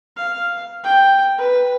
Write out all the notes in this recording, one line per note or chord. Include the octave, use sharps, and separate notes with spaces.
F5
G5
B4